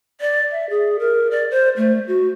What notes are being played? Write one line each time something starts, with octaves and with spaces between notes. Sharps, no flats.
D5
E5
G#4
A#4
D5
C5
A3
F#4